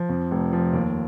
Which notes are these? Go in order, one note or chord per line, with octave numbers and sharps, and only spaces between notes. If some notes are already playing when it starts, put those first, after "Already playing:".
Already playing: F3
F2
F1
F3
D#2